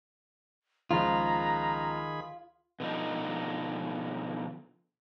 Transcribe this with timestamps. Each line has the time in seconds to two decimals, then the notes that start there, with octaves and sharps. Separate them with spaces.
0.91 C#2 D#3 F3 F4 G#4 A#5 B5
2.80 B2 D3 F3 D#4